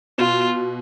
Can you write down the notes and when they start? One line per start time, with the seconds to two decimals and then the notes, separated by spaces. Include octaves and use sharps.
0.18 B2 F4